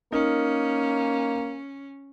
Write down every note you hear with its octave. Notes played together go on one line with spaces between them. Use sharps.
A#3 C#4 D#4 A#4